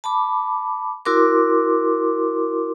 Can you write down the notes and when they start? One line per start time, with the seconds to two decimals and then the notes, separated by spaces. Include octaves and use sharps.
0.04 A5 B5 D6
1.05 E4 F#4 A#4 C6 D6